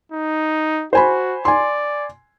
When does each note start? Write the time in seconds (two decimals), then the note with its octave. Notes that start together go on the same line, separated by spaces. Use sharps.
0.12 D#4
0.93 F#4 C5 G#5 B5
1.45 D5 G#5 C6